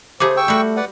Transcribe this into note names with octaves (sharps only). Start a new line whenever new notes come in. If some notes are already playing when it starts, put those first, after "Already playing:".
C#3 A3 G4 G#4 C5 D6
G5 C#6 E6
G3 A3 F#4
B4 D5 F#5